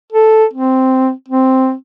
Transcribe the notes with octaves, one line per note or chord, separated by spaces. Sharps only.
A4
C4
C4